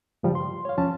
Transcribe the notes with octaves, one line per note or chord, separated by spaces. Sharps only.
G2 C#3 F3 G3
C6
C#5 F5
D#2 F3 C#4 A5